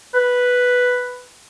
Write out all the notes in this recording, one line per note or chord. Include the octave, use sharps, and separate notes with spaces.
B4